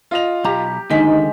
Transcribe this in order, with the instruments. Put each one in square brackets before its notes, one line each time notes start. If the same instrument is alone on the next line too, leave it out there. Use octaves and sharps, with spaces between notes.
[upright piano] F4 D#5 F7
[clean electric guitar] B1 A#5 [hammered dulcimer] G4
[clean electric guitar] D#2 D3 D#3 [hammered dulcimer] G#3 [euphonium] D#4 [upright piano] B6